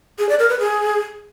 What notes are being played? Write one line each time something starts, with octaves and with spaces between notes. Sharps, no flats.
G#4
D5
A#4
B4
G#4